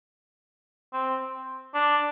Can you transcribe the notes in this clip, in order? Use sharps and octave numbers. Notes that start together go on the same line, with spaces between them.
C4
D4